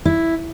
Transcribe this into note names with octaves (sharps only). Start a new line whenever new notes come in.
E4